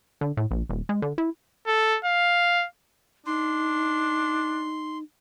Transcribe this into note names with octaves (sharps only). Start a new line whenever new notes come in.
D3
A2
A#1
D#1
G#3
D3
E4
A4
F5
D4 D#4 C6